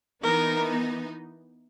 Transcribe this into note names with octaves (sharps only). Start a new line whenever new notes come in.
E3 B3 D#4 A#4